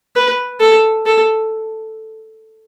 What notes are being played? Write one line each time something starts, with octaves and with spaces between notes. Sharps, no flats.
B4
A4
A4